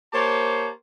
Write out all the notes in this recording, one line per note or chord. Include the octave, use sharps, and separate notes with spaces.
A#3 G4 C5 C#5 A5